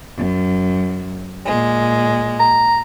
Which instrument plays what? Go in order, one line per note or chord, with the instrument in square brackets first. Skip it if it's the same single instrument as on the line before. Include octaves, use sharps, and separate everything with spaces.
[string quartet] F#2
A#2 G#3
[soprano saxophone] A#5